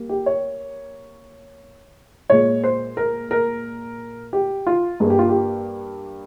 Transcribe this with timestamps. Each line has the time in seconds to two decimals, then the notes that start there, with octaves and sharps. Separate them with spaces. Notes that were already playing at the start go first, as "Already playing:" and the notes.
Already playing: G3 A#3
0.09 G4
0.26 C#5
2.29 A#2 G#3 C#5
2.64 C5
2.97 A#4
3.31 A#4
4.33 G4
4.67 F4
5.00 G2 G3 A#3 G#4
5.10 G4
5.19 F4
5.29 G4